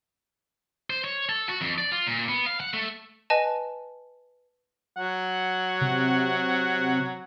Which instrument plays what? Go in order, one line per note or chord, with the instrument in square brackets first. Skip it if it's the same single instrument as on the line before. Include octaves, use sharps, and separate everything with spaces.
[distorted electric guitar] C5
C#5
A4
F#4
F2
D5
F4
A#2
B3
F5
F#5
A3
[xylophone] B4 D#5 G#5 A5
[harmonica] F#3 F#5
[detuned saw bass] C3